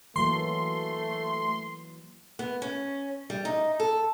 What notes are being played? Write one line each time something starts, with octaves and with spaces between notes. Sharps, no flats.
E3 F#3 A3 A#3 C6
B3
C#4
G3
D#4
A4